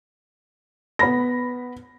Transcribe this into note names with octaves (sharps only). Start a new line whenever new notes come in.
B3 B5 A#6